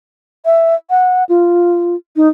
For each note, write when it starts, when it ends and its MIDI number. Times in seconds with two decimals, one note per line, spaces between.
0.45 0.75 76
0.90 1.24 78
1.29 1.95 65
2.16 2.28 63